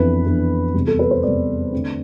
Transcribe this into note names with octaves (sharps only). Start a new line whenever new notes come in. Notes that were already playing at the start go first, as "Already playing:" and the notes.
Already playing: F2 E3 B3 D4 B4
F2 E3 B3 D4
E2 C3 G3
A4
B4
C5
E2 C3 G3 D5
D3 A3 C4